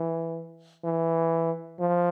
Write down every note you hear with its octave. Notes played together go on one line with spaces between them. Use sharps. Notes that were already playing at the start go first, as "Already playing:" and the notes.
Already playing: E3
E3
F3